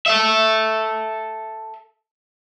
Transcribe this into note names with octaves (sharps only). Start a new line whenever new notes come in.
A4 E5